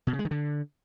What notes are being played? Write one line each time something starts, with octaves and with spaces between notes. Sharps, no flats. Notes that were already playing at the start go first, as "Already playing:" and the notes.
B2
C#3
G#3
D#3
D3